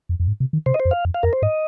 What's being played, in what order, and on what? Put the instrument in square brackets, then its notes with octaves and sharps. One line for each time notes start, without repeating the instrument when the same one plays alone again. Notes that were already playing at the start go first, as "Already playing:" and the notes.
[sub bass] F2
F2
G#2
C3
D#3
[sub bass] C3 [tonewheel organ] C5
[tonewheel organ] D#5
C5
[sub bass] F2
[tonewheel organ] F5
[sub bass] F2
[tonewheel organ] F5
[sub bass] F2 [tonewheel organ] A#4
[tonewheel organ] C5
[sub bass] G#2 [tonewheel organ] D#5